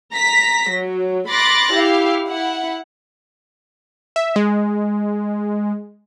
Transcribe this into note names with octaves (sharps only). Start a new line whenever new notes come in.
A#5 A#6 B6
F#3
B5 C6 D6 F#6 A6 A#6
E4 G4 F5
E4 F#5
E5
G#3